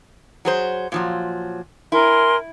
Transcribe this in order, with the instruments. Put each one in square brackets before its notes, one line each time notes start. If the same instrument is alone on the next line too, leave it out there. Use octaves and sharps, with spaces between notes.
[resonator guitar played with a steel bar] F#3 G#4 C5
A#2 F3 F#3
[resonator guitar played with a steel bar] E4 [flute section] A#4 G#5 C6